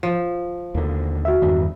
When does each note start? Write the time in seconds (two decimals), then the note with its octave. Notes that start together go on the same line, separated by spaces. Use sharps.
0.03 F3
0.75 D#2 D3
1.25 F#4 E5
1.42 E2 G2 D#3